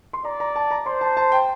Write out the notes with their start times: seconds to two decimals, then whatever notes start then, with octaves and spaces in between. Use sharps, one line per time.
0.13 C6
0.25 D5 A#5
0.40 A#5
0.56 A5
0.71 A#5
0.86 C5 C6
1.01 A5
1.17 A5
1.32 G5